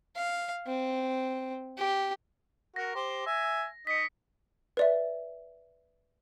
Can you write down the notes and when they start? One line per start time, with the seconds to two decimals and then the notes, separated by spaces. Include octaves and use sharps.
0.16 F5
0.67 C4
1.78 G4
2.76 F#4 A#4 A#6
2.95 G4 C5
3.26 E5 G#5
3.87 D#4 D#5 B6 C#7
4.77 B4 D5 E5